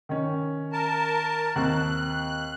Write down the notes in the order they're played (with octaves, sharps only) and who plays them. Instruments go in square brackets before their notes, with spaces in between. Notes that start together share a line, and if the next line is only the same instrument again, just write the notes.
[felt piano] D#3 C#4
[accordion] A#4 A5
[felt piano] D#2 C4 [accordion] F#6